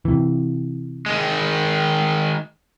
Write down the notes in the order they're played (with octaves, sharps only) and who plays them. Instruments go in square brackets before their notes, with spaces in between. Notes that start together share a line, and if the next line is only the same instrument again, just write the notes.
[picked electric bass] C3 E3
[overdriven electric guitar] D#3 G#3